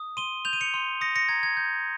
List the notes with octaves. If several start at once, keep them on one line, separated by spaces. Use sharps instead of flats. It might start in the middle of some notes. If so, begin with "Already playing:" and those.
Already playing: D#6
C6 D#7 G7
G6 F7
D#7
C#7 F7
C6
D#6 A#6 C#7
A#6 C#7
A#5 G#6
G#6
G6